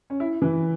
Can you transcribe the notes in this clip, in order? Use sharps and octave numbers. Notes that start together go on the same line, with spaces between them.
C#4
E4
E3